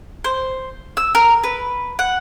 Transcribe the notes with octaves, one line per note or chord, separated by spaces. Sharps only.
C5
E6
A#4
B4
F#5